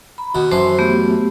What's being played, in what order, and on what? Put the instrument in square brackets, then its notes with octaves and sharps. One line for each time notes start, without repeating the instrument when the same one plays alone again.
[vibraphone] A#5 B5
[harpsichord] D#2 B2
[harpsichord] F#2 E3 [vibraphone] C5 A5 C6
[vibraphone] A3 B3 G4